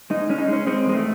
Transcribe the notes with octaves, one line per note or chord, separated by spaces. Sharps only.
G#3 D#4
G#3 C#4
D#4
G#3 C#4
G#3 C4
E2 G#3
A3